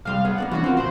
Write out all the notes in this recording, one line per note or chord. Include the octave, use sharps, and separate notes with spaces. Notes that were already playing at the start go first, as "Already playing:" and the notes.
C2 G3 F5 C6
B3 G#4
A#3 D4 D5
E3 C#4 D4 F#4
C4 F4 A#4
D2 A#2 C5 B5